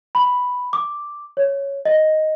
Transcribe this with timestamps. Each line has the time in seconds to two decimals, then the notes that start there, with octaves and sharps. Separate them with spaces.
0.15 B5
0.73 D6
1.37 C#5
1.85 D#5